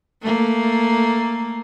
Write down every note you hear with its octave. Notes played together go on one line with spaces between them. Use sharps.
A3 A#3